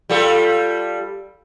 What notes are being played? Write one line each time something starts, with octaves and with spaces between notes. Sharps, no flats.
G3 F4 A4